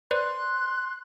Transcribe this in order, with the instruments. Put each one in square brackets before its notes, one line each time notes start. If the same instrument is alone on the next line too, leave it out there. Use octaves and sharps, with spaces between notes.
[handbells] B4 C5 D5 [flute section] C6 F#6